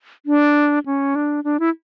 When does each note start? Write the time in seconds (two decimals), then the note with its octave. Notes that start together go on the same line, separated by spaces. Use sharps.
0.26 D4
0.86 C#4
1.15 D4
1.44 D4
1.60 E4